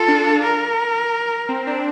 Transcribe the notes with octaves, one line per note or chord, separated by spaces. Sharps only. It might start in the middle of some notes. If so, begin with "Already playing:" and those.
Already playing: F4 A4
D4
A#4
C4
D4